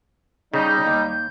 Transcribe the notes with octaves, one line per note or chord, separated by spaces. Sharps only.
C#3 G3 D#4 G6
D#2